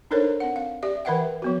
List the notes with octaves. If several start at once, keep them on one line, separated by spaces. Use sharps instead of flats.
D4 D#4 A4 A#4 C5 C#5
C4 F#5
F5
G4 D5 E5
E3 A#4 B4 E5 F#5 G5
F3 B3 F#4